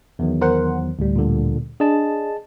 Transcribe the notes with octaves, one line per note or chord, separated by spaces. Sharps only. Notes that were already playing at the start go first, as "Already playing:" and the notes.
E2 D#3 F#3
A#4 C5 F#5
D2 A2 G3
A#2 D3
D4 G#4 D#5 A5